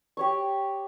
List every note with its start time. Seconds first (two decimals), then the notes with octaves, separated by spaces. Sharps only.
0.17 G4 C#5 C#6